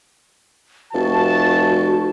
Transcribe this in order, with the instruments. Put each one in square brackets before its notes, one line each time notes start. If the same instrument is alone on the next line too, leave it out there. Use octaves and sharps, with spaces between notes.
[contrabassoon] F1 [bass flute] F#4 [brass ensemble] A5